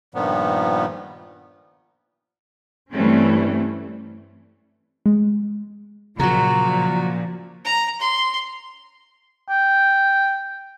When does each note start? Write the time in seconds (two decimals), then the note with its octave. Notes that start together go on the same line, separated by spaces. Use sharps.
0.15 G2 A#2 D#3 F3 B3
2.91 G2 E3 G3 A3 C4 C#4
5.06 G#3
6.20 A#2 C#3 F3 F#3 F#4 A#5
7.65 A#5
8.00 C6
9.49 G5